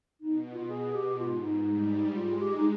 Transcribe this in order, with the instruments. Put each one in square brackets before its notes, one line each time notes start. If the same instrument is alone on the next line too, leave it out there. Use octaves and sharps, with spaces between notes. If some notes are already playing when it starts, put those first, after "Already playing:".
[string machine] B2 [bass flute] D#4
[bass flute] F4
[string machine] B2 [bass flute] G#4
[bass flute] G4
[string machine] G#2 [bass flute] F4
[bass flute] D#4
[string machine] G3
[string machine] G#3 [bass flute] F4
[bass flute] G4
D#4